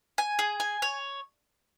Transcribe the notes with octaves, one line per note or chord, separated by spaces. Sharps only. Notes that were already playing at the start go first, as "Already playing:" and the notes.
G#5
G#4
G#5
C#5